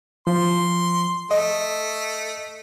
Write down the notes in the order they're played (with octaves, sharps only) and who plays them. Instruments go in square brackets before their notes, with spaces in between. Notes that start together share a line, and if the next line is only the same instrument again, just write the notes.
[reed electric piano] F3 [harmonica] C6
[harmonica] A3 [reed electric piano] D#5